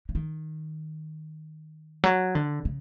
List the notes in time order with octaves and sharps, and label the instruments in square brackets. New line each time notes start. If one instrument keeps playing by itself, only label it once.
[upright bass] D3
D#3
F#3
D3
C#3